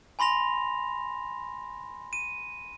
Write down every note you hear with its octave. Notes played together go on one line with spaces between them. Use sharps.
G#5 B5 C6 A#6 F7
D#7